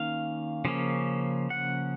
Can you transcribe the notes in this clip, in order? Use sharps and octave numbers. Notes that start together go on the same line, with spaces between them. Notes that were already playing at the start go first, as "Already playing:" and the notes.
Already playing: D#3 A#3 C#4 F5
C#3 F3 A#3 C#4
F#5